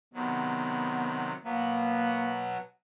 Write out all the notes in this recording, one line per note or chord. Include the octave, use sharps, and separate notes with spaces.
C3 D#3 F#3 B3
B2 F#3 A#3 B3